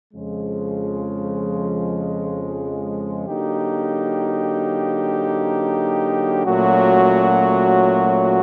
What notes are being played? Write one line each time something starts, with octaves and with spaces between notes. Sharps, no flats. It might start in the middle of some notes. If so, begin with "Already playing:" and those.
F2 C#3 F3 G#3
D3 F#3 A#3 D#4 G4
A#2 F#3 A3 C#4 F#4